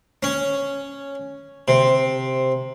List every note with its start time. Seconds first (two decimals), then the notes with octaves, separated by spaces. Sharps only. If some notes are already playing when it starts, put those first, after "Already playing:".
0.23 C#4
1.68 C3